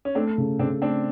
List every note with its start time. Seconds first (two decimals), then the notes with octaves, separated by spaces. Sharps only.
0.05 C#4
0.15 A3 C4 D4
0.38 C#3
0.59 C#3 C4 D4
0.82 A3 C4 D4